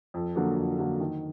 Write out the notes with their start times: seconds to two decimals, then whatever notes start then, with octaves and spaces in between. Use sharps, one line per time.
0.14 F2
0.36 D3 F#3 A#3
0.58 F2
0.78 D3 F#3 A#3
1.00 D#3